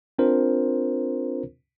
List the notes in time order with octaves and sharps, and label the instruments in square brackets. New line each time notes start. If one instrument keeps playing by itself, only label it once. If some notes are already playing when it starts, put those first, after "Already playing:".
[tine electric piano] C4 D4 F4 A#4 C5